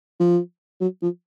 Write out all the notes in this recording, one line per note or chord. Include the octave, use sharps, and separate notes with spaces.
F3
F#3
F3